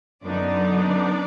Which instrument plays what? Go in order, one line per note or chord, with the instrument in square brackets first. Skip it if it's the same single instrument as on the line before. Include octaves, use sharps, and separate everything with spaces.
[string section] F#2 D3 F#3 B3 D4 D#4 D5